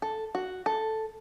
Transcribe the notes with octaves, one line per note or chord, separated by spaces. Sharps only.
A4
F#4
A4